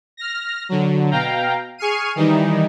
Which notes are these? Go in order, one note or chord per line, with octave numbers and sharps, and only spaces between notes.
F6 A#6
D3 F#3
B2 F5 G5 A#5
G#4 C#6 F6 C7 D#7
D#3 E3 G3 D#4